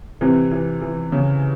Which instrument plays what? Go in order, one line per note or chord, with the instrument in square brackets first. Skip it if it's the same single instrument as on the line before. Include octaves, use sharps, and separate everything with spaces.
[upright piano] C3 [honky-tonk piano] E3
[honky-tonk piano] E3
E3
C#3